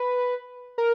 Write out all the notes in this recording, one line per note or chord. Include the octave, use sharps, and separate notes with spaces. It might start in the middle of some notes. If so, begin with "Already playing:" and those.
Already playing: B4
A#4